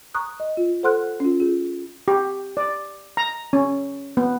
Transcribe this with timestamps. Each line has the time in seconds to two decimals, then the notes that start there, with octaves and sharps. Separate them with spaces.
0.14 A#5 C#6 D#6 F#6
0.40 D#5
0.57 F4
0.83 A4 C5 F#5 C6 F6 F#6
1.20 C#4 F4
1.40 F4 G#4
2.08 G4
2.57 D5
3.17 A#5
3.53 C#4
4.17 B3